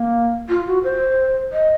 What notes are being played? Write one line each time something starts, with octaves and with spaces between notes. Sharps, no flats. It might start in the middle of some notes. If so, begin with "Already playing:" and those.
Already playing: A#3
F4
F#4
C5
D#5